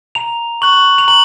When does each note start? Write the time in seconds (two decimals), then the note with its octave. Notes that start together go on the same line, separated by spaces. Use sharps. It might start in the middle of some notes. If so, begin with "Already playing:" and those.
0.15 A#5 F7
0.62 C#6 F#6 F#7
0.98 F7
1.08 A#5 F#7